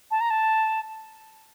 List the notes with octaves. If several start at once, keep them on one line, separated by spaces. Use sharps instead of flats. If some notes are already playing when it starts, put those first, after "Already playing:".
A5
A#5
A5